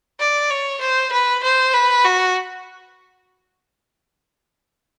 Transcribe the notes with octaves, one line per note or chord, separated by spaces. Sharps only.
D5
C#5
C5
B4
C5
B4
F#4